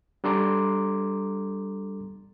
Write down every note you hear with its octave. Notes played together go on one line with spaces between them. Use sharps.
G3 D4 A4 A#5 C6 D6